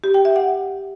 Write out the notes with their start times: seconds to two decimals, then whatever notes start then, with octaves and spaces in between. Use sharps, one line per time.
0.04 G4
0.14 G5
0.25 E5
0.36 F#5